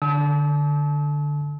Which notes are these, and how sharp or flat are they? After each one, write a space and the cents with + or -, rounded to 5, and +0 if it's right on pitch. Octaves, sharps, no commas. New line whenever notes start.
D3 +0 A5 -25 E6 -45